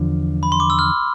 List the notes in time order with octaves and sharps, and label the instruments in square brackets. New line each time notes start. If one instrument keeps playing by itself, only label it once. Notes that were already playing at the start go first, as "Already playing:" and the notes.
Already playing: [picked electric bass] E2 D3 F3
[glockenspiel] B5
C6
D6
E6
F6